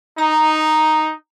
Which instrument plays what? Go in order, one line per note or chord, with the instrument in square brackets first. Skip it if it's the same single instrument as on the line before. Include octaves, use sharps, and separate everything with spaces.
[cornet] D#4 [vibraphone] A#5